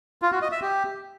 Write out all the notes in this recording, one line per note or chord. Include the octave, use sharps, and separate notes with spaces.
F4
F#4
D#5
E5
G4